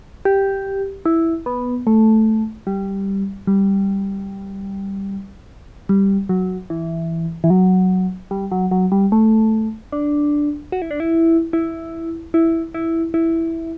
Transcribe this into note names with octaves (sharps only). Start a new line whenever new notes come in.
G4
E4
B3
A3
G3
G3
G3
F#3
E3
E3
F#3
G3
F#3
F#3
G3
A3
D4
F#4
E4
D4
E4
E4
E4
E4
E4